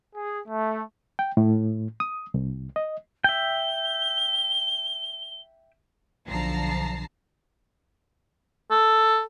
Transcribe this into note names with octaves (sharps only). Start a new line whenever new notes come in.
G#4
A3
G5
A2
D#6
C2
D#5
E5 G5 G7
B1 D3 F3 A5 A#5 C7
A4